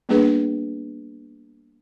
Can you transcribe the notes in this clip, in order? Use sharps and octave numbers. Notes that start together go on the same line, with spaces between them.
G3 A#3 B3 D4 G#4 B4